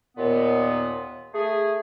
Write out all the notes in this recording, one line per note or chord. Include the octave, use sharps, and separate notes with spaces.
D#2 A#2 B3
A3 G#4